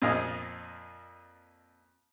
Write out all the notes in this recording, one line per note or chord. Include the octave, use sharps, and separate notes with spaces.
F2 A#2 D#5 F5 G#5 D#6